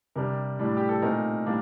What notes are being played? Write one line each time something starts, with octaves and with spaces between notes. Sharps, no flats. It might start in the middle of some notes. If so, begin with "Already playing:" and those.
C3 G3 D4 A#4
A2 G3 D4
G4
A4
A#2 A3 C4 D#4 A#4
A2 G3 A#3 D4